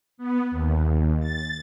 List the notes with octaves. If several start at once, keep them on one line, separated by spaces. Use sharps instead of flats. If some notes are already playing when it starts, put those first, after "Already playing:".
B3
D#2
A6